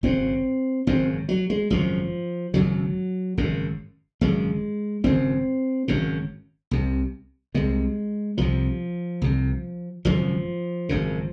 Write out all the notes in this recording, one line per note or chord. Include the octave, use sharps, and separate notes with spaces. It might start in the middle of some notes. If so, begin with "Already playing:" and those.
G#1 F#2 C#3 C4
G#1 F#2 C#3 C4
F#3
G#3
G#1 F#2 C#3 F3
G#1 F#2 C#3 F#3
G#1 F#2 C#3
G#1 F#2 C#3 G#3
G#1 F#2 C#3 C4
G#1 F#2 C#3
C2 C3
C2 C3 G#3
C2 C3 F3
C2 C3
G#1 F#2 C#3 F3
G#1 F#2 C#3